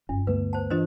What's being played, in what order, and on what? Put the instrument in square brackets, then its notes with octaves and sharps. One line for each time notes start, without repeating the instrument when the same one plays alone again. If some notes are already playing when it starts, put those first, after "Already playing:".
[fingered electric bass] F#1 C#4 [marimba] G2
[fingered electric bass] D2 A3 B3 [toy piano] B4
[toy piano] C5 A5
[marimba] E3 D4 F4 [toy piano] C5 D#5